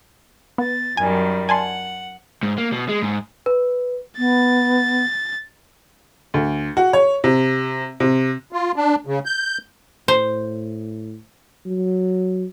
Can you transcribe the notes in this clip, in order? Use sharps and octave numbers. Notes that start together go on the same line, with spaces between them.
B3 A6
F#2 D#3 G3 G#5
F#5 G#5 A5 C6
G#2
A#3
B2
G#3
G#2
B4
B3 A6
D2
F#4
C#5
C3
C3
F4
D4
C#3
G6
A2 C5
F#3